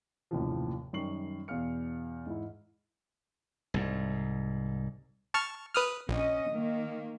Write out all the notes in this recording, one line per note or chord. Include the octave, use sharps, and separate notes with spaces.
F#1 D#2 A2 C3 E3 F3
F#2 D#3 G3 C#6 C7 F#7
E2 B2 F5 F6 C#7
G#2 E3 E4
C2 G#2
A5 C#6 F6
B4 D#6 F6
A#1 C#4 D#5
D#3 A#3